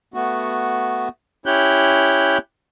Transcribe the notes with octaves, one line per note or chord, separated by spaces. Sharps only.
A3 B3 F#4
C#4 E4 G4 C#5 F#6 G6